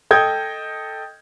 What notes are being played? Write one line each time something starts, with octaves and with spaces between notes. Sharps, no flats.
A4 D#5 G5 D#6 G6 G#6